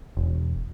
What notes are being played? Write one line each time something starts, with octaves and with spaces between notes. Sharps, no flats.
E1